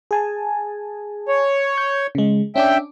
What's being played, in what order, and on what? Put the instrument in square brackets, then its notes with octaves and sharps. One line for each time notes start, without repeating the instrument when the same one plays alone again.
[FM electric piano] G#4 G#5 A5
[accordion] C#5
[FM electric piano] G6
C#3 G#3
[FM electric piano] C#4 D4 D6 [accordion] E5 G5